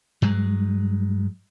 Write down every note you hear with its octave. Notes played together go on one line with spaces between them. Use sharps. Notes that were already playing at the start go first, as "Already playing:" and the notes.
G2 F#3 G#3